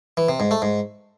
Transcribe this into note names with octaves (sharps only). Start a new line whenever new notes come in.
E3
C3
G#2
A3
G#2